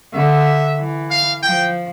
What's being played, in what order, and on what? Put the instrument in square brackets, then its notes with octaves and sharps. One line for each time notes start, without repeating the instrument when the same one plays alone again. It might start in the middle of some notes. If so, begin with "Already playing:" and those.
[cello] D3 [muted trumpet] E5
[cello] E3
[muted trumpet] F5
[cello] F3 [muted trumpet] G5